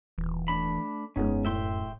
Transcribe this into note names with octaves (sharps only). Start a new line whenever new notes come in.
D#1 E3
A3 D4 B5
E1 F#2 G#3 B3 C#4 D#4
A2 E5 G5 C6